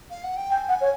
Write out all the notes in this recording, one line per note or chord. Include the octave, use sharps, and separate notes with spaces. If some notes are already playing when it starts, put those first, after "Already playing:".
F5
F#5
G5
G5 G#5
F#5
C#5